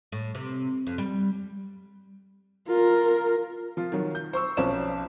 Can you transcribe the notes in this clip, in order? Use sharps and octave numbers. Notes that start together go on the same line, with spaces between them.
A2
C3
F2
G3
F4 A#4
F3 F4
D#3 F#3
G6
C5 C#6 E6
B1 F3 C#4 C5 D5 E7